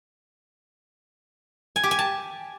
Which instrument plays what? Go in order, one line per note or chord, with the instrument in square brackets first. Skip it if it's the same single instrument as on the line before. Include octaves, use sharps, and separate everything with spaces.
[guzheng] G#5
G4
G#5
A5